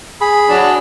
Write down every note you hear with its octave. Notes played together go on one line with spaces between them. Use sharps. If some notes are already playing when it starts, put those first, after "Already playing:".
G#4 B5
F#3 D4